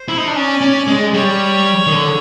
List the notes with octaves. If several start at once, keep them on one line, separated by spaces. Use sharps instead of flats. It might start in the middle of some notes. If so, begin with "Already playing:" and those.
Already playing: C5
E4
D#4
D4
C#4 D5
C#4
G#3
G3 C#5
D#3
D3